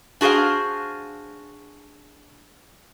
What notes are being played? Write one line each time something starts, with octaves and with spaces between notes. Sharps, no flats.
D4 F#4 G#4 C5 F5